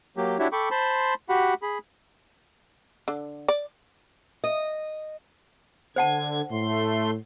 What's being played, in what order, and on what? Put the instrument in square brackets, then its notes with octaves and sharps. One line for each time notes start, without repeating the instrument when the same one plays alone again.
[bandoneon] F#3 A#3 G4
D4 E4 F#4 G4 C#5 E5
A4 G5 B5 C#6 D6
C5 A5 B5 C6
F#4 G4 F#5 B5
G#4 B5
[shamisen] D3
D5
[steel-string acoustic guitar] D#5
[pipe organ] D3 G#6 [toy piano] C5 F#5 A5
[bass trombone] A2 [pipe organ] A3 C6